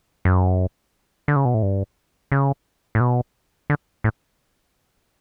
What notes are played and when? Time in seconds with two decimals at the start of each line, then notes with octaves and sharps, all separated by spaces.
0.25 F#2
1.28 D3
1.36 C#3
1.45 B2
1.54 A2
1.63 G2
2.32 C#3
2.95 A2
3.00 B2
3.70 D3
4.04 A2